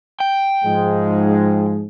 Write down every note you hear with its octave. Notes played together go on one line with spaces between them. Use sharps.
G5
G#2 F3 G#3